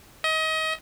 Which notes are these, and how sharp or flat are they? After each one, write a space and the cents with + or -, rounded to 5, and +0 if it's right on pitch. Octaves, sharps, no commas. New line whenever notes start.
D#5 +30